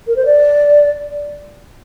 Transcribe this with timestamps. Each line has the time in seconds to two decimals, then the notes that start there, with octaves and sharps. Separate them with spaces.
0.07 A#4
0.16 C5
0.25 D5